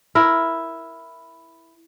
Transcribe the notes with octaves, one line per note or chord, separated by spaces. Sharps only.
E4 A#4